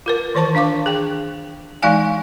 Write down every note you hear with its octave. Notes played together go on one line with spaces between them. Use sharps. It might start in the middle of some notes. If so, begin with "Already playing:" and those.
F4 A#4 B4
D#3 E3 C5 A5 C#6
D4 F5 C#6 D6
G#4 G5
E3 G#3 D#4 D5 F5 G#5